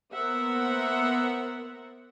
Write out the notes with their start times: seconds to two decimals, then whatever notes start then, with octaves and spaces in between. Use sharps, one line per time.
0.13 A#3 B3 A#4 C5 E5 F#5